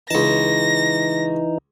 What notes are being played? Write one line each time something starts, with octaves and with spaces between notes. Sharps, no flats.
C#2 E3 D#4 A5 A#6